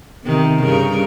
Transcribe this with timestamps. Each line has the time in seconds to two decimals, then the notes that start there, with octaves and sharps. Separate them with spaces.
0.24 C3 D#3
0.64 G2 C#3 A#4